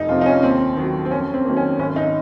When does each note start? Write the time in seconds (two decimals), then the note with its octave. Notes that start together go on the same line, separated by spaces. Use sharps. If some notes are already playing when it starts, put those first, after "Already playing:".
Already playing: F1 D#4
0.09 F2 C3 F3 F4
0.21 D#4
0.26 C#4
0.42 D#2 C4
0.77 D#3 F#3
1.05 C4
1.11 F2 C#4
1.34 C4
1.45 D#3 F#3 A#3
1.56 C#4
1.79 G#1 C#4
1.96 D#4